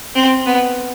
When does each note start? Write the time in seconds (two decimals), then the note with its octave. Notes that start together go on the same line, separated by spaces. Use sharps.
0.15 C4
0.46 B3